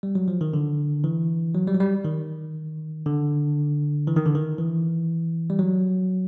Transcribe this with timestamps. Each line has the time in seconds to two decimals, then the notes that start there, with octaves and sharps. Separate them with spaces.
0.03 G3
0.15 F#3
0.28 F3
0.41 D#3
0.53 D3
1.04 E3
1.54 F#3
1.67 G3
1.75 F#3
1.80 G3
2.05 D#3
3.06 D3
4.07 E3
4.17 D#3
4.26 D3
4.35 D#3
4.58 E3
5.50 G3
5.59 F#3